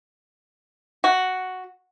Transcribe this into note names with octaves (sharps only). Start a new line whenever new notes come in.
F#4